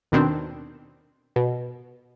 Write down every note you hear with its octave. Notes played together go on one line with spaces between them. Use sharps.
D#2 B2 D#3 C4 D4
B2